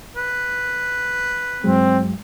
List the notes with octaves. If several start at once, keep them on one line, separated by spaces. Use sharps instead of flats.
B4
G2 F#3 G#3 C4